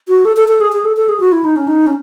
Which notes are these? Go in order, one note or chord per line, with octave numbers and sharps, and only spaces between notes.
F#4
A4
A4
A4
G#4
G#4
A4
A4
G#4
F#4
E4
D#4
C#4
D#4
C#4